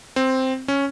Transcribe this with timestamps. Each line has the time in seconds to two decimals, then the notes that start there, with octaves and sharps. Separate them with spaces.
0.16 C4
0.68 C#4